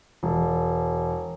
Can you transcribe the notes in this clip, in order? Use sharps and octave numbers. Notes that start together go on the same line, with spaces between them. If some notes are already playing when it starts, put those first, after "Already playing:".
E1